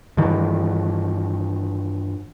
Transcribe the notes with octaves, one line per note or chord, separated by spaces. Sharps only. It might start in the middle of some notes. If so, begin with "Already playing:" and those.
G2 D#3 E3